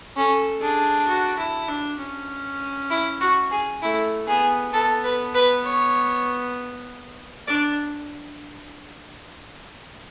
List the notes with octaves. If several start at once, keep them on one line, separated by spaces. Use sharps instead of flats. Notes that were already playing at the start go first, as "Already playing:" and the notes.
C#4 A4
D4 G#4
F#4
E4
D4
C#4
E4
F#4
G#4
A3 E4
B3 G#4
B3 A4
B4
B4
C#5
D4 D5